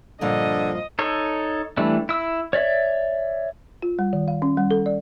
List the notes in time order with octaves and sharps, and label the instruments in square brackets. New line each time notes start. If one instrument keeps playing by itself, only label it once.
[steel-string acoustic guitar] G2 A#2 F3 [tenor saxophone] D3 [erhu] D#5
[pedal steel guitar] D#4 A4 C#5
E3 G3 A3 D4 E4
E4 E6
C#5 D5 E5
[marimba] F4
G3
D#3
F5
C#4
G3
A4
D5